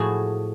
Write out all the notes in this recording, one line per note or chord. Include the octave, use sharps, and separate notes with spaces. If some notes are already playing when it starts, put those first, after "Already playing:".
Already playing: A2 F3 F#4 G#4